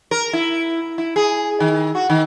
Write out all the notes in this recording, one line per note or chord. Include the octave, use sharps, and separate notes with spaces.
A#4
E4
E4
G#4
D#3
F#4
D#3